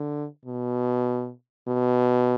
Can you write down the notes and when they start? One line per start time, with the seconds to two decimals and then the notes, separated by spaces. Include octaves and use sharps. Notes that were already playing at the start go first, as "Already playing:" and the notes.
Already playing: D3
0.45 B2
1.68 B2